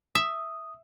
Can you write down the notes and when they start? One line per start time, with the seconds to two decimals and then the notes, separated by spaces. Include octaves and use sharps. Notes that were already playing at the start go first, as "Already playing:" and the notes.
0.15 E5 D#6